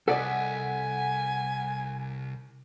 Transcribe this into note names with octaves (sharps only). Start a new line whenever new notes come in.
C2 A4 D5 D#5 F#5 G#5 B6